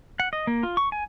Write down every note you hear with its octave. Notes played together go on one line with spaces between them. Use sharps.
F#5
D#5
A#3
F4
C#6
G#5